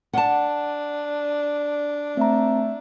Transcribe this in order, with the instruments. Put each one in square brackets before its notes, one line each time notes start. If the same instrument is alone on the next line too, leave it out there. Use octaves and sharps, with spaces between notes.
[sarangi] D4 [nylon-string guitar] F#5 A5
[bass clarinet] A3 [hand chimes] C4 A#5